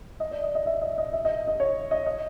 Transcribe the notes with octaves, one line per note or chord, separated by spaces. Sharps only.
D#5
D5
D#5
D#5
E5
D#5
D#5
E5
D#5
D#5
C#5
D#5
D#5